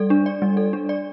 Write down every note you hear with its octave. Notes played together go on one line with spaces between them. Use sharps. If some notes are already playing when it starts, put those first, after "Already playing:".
Already playing: G3 A4 D5
D4
D5
G3
A4
D4
D5